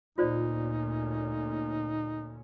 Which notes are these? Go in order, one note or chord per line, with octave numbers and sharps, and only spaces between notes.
D2 A#2 C#4 D#4 F4 C5 D5